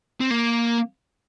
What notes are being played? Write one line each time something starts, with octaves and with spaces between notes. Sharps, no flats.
C4
A#3